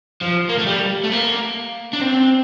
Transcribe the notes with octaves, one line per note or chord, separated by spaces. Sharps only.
F3
A#3
A3
G3
A3
A#3
D4
C4